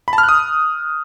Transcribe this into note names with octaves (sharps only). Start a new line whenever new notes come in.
B5
A5
F6
F#6
D#6